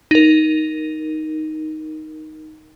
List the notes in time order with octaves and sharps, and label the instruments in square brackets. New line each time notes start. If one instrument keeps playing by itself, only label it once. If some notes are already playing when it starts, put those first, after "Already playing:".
[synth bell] D#4 A#4